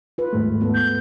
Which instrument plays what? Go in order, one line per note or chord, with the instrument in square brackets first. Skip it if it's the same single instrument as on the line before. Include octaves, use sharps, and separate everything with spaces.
[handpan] F4 B4
[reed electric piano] D#2 G#2 A3
[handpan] B3 A4
[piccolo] G6